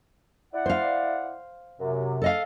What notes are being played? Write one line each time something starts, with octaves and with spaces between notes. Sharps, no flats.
E4 D5 F#5
C5 F5
F#2 C3
A4 D#5 F5